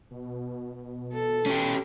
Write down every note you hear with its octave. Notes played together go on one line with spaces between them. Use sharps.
B2
A4
C#4 G4